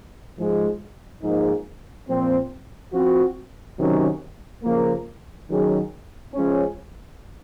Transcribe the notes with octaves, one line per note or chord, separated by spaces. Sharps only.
G#2 F3 G#3
G#2 F3 A#3 D#4 G#4
A#2 F3 C4
F3 C4 F#4
C3 D#3 F#3 C#4
C#3 F3 A#3
D#3 F#3 C#4 G#4
F3 G#3 C#4